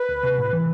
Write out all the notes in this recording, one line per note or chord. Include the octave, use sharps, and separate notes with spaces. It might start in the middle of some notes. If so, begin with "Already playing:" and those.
Already playing: B4
D2
C3
A2
E3